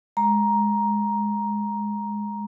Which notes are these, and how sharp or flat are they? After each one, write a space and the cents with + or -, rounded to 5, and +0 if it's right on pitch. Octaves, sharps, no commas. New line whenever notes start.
G#3 +0 A#5 +10